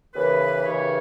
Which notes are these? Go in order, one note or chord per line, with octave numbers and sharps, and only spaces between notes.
D#2 C#3 E3 B4
D#2 C#3 E3 C#5